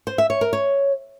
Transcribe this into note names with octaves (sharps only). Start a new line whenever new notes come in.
C5
E5
C#5
A#4
C#5